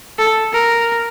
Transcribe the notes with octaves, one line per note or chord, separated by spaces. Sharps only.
A4
A#4